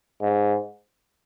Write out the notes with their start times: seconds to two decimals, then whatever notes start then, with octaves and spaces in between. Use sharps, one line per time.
0.22 G#2